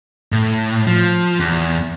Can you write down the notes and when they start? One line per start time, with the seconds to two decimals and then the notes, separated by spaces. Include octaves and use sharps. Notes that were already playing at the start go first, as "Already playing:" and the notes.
0.32 A2
0.87 F3
1.40 E2